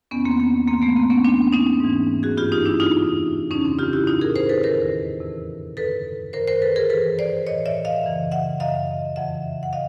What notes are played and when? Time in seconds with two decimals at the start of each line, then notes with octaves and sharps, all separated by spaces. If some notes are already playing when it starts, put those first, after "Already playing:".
0.11 E2 C3 D#3 B3 C#4
0.25 A#3 C4
0.39 A#3 C4
0.67 G#2 E3 A#3 C4
0.82 A3 B3
0.96 A#3 C4
1.10 B3 C#4
1.25 E2 C3 E3 C4 D4
1.53 C#4 D#4
1.81 G#2 E3
2.23 F#4 G#4
2.37 G2 E3 F4 G4
2.52 D#4 F4
2.66 D4 E4
2.80 D#4 F4
2.94 F2 C3 E3
3.50 F2 C#3 E3 C#4 D#4
3.65 C4 D4
3.79 F4 G4
3.93 E4 F#4
4.07 A2 E3 D#4 F4
4.21 G#4 A#4
4.36 A#4 C5
4.49 A4 B4
4.64 E2 C3 D#3 A#4 C5
5.20 F2 C3 E3
5.77 G2 D3 A4 B4
6.33 F#2 D#3 A#4 C5
6.48 A#4 C5
6.62 A4 B4
6.76 G#4 A#4
6.90 G2 E3 A4 B4
7.19 C5 D5
7.47 A2 E3 C#5 D#5
7.66 D5 E5
7.85 D#5 F5
8.03 F#2 C#3 E3
8.32 E5 F#5
8.60 F#2 C#3 E3 D#5 F5
9.16 F2 C#3 E3 E5 F#5
9.63 F#5
9.73 A2 D#5 F5